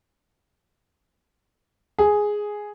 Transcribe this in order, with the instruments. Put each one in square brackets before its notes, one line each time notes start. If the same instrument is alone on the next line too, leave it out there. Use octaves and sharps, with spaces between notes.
[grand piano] G#4